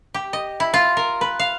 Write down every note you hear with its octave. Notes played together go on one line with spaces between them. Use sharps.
G4
D#5
E4
F4
A#4
B4
F5